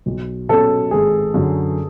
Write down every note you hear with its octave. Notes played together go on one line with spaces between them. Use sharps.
B1
B2 F#3 C#4 A4
G#1 G#4
F#2 D3 F#3